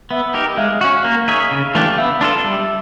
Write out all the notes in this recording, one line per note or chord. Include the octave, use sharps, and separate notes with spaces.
B3 E5
D#4 G4 A#4
G#3 F5
C#4 F#4 F5
A#3
D#4 G#4 C#5 E5
C#3 F5
E3 A3 D4 G4
B3 E5
D4 F4 A4
G3